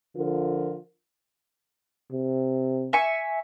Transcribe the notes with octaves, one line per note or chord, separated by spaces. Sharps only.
D3 F3 F4 A#4
C3
E5 G#5 C#6